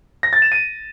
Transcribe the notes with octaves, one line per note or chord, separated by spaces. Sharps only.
A#6
A6
E7
D#7